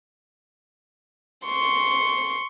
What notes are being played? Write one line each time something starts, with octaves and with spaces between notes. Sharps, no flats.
C6 C#6